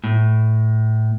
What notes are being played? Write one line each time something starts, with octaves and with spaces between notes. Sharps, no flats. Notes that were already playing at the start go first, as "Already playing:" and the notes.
A2